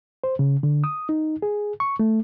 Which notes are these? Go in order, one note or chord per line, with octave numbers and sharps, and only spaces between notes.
C5
C#3
D3
D#6
D#4
G#4
C#6
A3